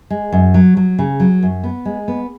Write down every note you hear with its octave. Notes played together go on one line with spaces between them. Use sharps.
G#3
F#2
F#3
F#3
C#3
F#3
F#2
B3
G#3
B3